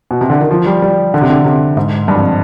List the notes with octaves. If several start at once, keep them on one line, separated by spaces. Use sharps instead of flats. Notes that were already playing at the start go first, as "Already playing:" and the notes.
B2
C3
D3
D#3
F3
G3
G3
D3
C3
D3
C3
G#2
G2
F2